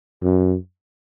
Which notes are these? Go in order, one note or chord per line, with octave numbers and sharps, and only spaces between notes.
F#2